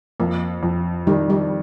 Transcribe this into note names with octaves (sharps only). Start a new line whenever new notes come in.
F2 A#3
F2
D#3 G3
G3